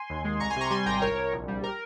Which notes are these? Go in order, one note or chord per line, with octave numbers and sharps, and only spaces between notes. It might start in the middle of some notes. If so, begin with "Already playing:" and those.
Already playing: G#5 C6
D#2
G#3
C2 A#5 C#6
G#5 C6
C3 A#5 C#6
G3 G#5 C6
G#1 G5 A#5
C2 A#4 C#5
C2
A#1
G3
A#4